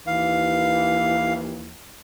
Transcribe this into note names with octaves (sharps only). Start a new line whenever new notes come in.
D#2 E3 F5